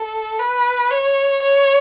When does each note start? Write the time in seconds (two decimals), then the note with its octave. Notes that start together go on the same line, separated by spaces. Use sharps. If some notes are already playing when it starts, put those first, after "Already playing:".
Already playing: A4
0.39 B4
0.90 C#5
1.42 C#5